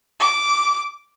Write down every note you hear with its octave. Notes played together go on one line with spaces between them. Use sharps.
D6